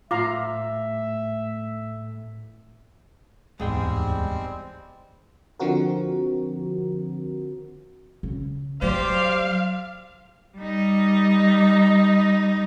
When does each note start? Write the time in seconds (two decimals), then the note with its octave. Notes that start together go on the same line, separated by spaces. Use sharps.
0.11 A2 F4 E5 F5 A#5 D6
3.60 D1 E2 G#2 G3 G#3 C4 G#4 G5
5.59 D3 F3 C4 F#4 A#4
8.23 C#3 C#4
8.82 F#3 G3 G4 C5 D5 F5
10.58 G3 D#4